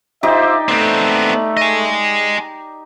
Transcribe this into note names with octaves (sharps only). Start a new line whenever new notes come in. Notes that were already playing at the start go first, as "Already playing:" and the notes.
D#4 F4 G4 C5 D5 E5
A3 B3 C4
D#5 G#5